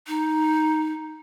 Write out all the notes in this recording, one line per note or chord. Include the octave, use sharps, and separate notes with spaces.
D#4